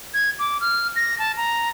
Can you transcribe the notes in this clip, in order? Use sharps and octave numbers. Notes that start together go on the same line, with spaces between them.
G#6
D6
F6
A#6
A5
A#5